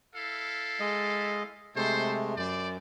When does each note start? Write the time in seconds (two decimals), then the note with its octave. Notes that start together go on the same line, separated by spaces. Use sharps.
0.15 E4 A4 F5
0.80 G#3 D#5
1.76 C3 G#3 A3 A4 C5
2.37 F#2 C5 D5